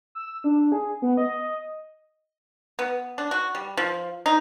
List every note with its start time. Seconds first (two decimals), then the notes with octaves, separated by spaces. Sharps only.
0.15 E6
0.44 D4
0.72 G#4
1.02 B3
1.17 D#5
2.79 B3
3.18 D4
3.31 F#4
3.55 G3
3.77 F3
4.26 D#4